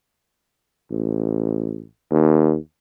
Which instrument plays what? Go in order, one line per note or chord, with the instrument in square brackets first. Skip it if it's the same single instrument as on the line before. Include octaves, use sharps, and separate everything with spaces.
[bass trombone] A1
D#2